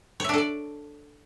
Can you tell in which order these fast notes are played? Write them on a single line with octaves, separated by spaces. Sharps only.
C#5 E5 D4 A4 D5